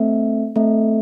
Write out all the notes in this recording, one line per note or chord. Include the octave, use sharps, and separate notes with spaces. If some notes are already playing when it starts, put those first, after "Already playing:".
Already playing: A3 C4 A4 E5
A3 C4 A4 E5